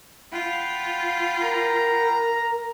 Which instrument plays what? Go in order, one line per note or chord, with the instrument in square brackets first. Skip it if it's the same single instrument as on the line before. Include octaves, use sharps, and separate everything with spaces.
[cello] F4 [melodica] F#5 G5 B5
[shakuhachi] A#4 [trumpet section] A#5